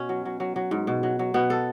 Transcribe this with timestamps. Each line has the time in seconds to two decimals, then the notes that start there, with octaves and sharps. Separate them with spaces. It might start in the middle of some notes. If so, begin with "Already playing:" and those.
Already playing: B2 C#4
0.09 F#3
0.25 F#3
0.40 F#3
0.56 F#3
0.71 G#2
0.87 B2
1.03 F#3
1.19 F#3
1.34 B2 B3
1.50 A4